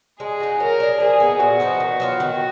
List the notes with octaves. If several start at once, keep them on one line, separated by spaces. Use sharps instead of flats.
G#3 G#4
D#4 F#4
F#3 A#4
D4 G#4
F3 G#4
B3 D#4
A#2 F#4
F3 B3 D#4
D#3
F#3 B3 F4
D#3 F#4